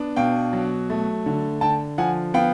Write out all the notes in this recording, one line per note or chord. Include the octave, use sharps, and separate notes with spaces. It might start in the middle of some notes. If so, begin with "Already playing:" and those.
Already playing: B3 D4
B2 F5 G5
F#3
A3
D3
D3 G5 A5
F3 F#5 G#5
B3 F5 G5